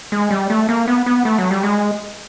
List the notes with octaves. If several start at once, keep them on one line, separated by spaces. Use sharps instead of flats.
G#3
G3
A3
A#3
B3
B3
A3
F#3
G3
G#3